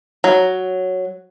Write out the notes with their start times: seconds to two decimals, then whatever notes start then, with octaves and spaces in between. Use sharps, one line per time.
0.24 F#3